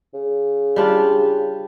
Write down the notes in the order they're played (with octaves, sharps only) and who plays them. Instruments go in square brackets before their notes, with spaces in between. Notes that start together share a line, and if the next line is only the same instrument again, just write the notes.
[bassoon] C#3
[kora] G3 D4 F4